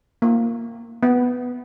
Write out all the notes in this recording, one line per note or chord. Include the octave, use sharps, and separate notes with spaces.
A#3
B3